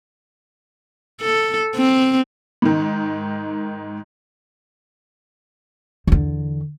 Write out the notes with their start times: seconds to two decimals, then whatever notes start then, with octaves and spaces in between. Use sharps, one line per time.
1.21 A4
1.76 C4
2.62 G#2 D#3
6.07 E2 D3